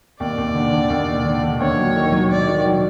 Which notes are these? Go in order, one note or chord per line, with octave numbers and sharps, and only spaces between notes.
D#2 D5
D#2
D3
D3
D#2
D3
D3
D3
D#2 C#5
F#3
D#3
F#3
F#3 D5
D#3
F#3